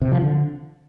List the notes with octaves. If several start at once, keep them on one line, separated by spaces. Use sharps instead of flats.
C3
F3
D3